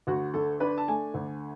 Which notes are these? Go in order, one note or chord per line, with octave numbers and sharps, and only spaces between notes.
D2 F#4
D3 A4
D4 B4
A5
A3 G#5
D2